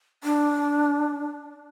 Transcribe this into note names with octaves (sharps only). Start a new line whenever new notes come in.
D4